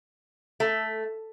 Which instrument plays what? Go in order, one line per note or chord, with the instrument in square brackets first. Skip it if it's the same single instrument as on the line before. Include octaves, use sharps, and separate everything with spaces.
[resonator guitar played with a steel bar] A3